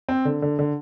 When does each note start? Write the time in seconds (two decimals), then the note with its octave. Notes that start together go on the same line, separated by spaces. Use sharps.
0.09 C4
0.25 D3
0.42 D3
0.59 D3